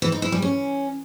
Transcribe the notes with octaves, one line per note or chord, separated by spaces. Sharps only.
E3
D#4
E4
G3
C#4